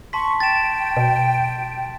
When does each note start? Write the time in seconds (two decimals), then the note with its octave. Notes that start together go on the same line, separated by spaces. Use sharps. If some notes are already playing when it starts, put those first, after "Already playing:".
0.13 A5 C6 C#6 B6
0.40 G5 A6 E7
0.97 B2